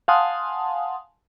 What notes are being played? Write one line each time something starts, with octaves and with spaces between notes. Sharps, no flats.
F5 F#5 G#5 A5 C6 D#6